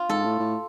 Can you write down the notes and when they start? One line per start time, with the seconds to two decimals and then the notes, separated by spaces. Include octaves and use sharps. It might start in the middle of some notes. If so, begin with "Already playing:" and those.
Already playing: F4
0.09 G#2 A4
0.25 A2
0.39 A2